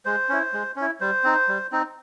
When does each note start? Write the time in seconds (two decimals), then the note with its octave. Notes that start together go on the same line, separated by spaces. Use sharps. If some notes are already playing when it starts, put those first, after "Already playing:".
0.05 G#3 C5
0.29 C#4 E4
0.53 G#3
0.76 C#4 E4
1.01 G3 C5
1.24 C4 D#4
1.48 G3
1.72 C4 D#4